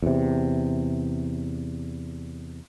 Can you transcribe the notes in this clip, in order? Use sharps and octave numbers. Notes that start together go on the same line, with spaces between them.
E2 C3